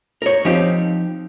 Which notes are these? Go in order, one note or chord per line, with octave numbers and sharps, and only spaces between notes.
A#4 C#5
F3 C4 D#4 G4